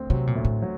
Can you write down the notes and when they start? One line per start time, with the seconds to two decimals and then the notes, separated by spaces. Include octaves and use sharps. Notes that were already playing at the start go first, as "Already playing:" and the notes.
Already playing: D2 C4
0.10 C3 F#3
0.27 A#2
0.35 D2
0.45 A2
0.62 F#3